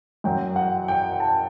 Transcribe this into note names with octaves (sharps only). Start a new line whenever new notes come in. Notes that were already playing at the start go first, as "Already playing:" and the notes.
F#2 F#3 G5
F#5
G5
A5